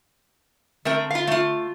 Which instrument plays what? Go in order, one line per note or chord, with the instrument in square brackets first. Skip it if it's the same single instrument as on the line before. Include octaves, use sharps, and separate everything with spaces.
[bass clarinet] D3 [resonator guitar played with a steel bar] A3 C4 A#4
[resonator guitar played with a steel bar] F4 F5
A3 F4